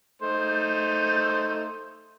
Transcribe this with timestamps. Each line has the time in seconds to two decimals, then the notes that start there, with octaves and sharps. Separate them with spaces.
0.22 A3 D#4 C5